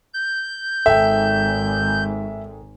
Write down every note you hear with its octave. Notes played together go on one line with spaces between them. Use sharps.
G6
G#1 G#2 A4 E5 G5